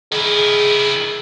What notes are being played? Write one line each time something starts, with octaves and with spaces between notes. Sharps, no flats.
D#3 E4 G#4